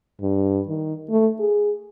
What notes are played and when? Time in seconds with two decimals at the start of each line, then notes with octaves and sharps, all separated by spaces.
0.22 G2
0.68 D#3
1.10 A3
1.40 G#4